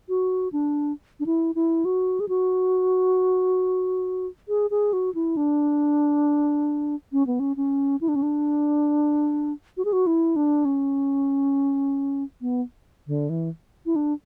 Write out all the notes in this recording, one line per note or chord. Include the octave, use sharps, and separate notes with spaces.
F#4
D4
D4
E4
E4
F#4
G#4
F#4
G#4
G#4
F#4
E4
D4
C#4
B3
C#4
C#4
E4
D4
C#4
D4
F#4
G#4
F#4
E4
D4
C#4
B3
D3
E3
E4
D4